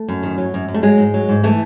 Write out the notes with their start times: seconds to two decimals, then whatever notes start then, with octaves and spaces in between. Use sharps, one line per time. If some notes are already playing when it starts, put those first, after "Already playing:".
Already playing: A3
0.08 F#2
0.23 D#3
0.38 F#3
0.54 F#2
0.68 F#2
0.74 A3
0.83 F#3 G#3
0.98 G#2
1.14 F#3
1.29 G#2
1.43 E3 A3